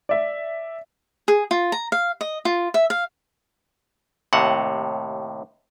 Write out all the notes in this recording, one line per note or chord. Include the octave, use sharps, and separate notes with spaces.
D5 E5
G#4
F4
A#5
F5
D#5
F4
E5
F5
D#2 A2 C3 F#5